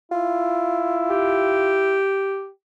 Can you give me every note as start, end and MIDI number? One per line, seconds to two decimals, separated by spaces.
0.12 2.02 64
0.12 1.77 65
1.10 2.48 67